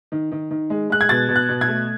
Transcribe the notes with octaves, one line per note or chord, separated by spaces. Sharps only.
D#3
D#3
D#3
G#3
G#3 F#6
G#6
B2 A6
B2
F#6
B2
G#6
A3